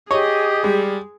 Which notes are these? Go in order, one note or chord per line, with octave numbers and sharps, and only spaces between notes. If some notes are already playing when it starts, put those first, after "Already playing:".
G4 G#4 C#5 D#5
G3 G#3